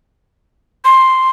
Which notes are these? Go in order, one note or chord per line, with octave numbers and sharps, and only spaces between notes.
C6